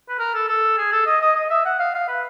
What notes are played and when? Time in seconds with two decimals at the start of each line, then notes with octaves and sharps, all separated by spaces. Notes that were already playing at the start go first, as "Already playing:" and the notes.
0.09 B4
0.19 A#4
0.34 A4
0.48 A4
0.78 G#4
0.92 A4
1.06 D#5
1.22 D#5
1.36 D#5
1.50 E5
1.65 F#5
1.80 F5
1.94 F5
2.08 B4